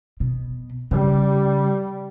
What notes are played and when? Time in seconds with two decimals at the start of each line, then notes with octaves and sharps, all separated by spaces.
0.20 B2
0.91 C#3 G3